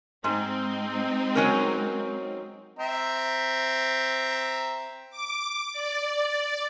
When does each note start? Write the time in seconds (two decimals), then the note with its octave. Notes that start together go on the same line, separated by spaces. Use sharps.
0.24 G#2 G#3 C4 D#4
1.35 F#3 C#4 A#4
2.79 C4 E5 A#5
5.10 D6
5.72 D5